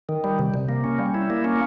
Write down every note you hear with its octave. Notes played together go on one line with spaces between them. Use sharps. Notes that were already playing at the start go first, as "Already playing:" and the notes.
D#3
G3
C3
C3
A#3
C#4
G3
E4
A#3
C#4